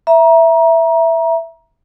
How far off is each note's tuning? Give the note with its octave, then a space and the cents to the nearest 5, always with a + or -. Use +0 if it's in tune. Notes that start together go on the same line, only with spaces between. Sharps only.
E5 +5 A#5 +25